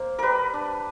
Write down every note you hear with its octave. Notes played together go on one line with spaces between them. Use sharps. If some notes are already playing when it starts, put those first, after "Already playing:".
Already playing: A#3 C5
G3 A#4 B4
D4